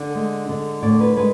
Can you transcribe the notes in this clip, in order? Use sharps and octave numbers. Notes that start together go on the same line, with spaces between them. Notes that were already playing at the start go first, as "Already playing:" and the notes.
Already playing: D3
G#3
D3
A2 D5
B4
G#3 B4